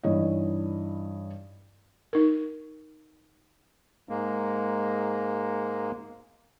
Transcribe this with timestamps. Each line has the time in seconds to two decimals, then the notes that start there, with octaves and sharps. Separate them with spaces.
0.03 G2 E3 D#4 C#5 D#5
2.13 D#4 A#4
4.09 G#2 G#3 A#3